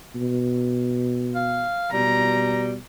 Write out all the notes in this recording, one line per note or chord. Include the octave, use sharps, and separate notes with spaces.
B2
F5
B2 G3 A#5